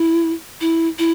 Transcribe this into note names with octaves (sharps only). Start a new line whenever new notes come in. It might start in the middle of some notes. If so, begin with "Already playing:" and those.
Already playing: E4
E4
E4